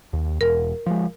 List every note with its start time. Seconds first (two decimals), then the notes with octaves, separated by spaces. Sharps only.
0.13 D#2
0.41 E1 A#4
0.86 F3 G#3